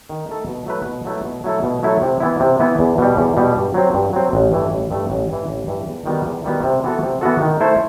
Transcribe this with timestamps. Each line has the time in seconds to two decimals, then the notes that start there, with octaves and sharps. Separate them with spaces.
0.09 D#3
0.29 A3 D#4 A4
0.47 B2
0.66 F#3 A3 E4 B4
0.86 B2
1.05 F#3 A3 E4 B4
1.25 B2
1.44 F#3 A3 E4 A4
1.63 B2
1.83 F#3 A3 E4 A4
2.02 C3
2.20 E3 B3 E4
2.40 C3
2.59 E3 B3 E4
2.79 E2
2.98 B2 G3
3.17 E2
3.37 B2 G3
3.56 G2
3.74 F#3 C4
3.94 G2
4.13 F#3 C4
4.33 A1
4.52 G2 E3 A3
4.71 A1
4.91 G2 E3 A3
5.10 A1
5.29 G2 E3
5.48 A1
5.67 G2 E3
5.88 E2
6.06 D#3 G3 B3 F#4
6.26 E2
6.44 D#3 G3 B3 F#4
6.64 C3
6.83 E3 B3 F#4 A4
7.03 C3
7.21 E3 B3 F#4 A4
7.41 D#3
7.60 A3 E4 A4 C5